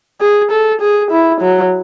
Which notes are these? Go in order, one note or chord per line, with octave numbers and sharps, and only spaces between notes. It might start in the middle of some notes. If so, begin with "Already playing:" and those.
G#4
A4
G#4
E4
F#3